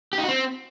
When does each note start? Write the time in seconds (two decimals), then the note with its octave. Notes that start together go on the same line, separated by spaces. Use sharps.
0.13 G4
0.18 D#4
0.23 F#4
0.28 C4